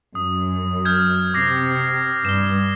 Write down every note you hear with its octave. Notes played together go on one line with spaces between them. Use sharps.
F#2 D#6
F6 G6 G#6
C3 D6 A#6 C7
G2 E7 G7